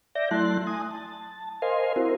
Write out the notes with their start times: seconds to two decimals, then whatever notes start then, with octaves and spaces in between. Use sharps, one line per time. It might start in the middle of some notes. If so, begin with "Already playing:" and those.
0.15 D5 E5 G6 A#6
0.31 F#3 A3 E4 A5 C6 F#6
0.67 G#5 D#6
0.91 A5
1.62 A#4 C5 D#5 F5 G#5 C6
1.96 C4 E4 F#4 A#4 C5